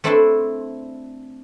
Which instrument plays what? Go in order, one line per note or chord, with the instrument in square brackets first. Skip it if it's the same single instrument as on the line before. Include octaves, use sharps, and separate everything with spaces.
[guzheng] A3 C4 D4 E4 A5 C6